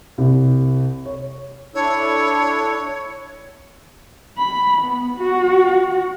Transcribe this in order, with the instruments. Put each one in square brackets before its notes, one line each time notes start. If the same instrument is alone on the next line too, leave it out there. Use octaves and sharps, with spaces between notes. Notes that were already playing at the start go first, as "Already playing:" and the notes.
[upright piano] C2
C#5
[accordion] D4 E4 A4 [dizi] C#5
[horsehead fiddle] B5
B3
F#4